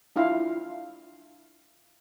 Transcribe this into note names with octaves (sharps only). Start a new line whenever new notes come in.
D4 E4 F4 F5